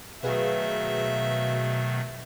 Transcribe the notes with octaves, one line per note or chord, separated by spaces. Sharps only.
B2 D#3 F#3 A3 G#4 B4 E5 F5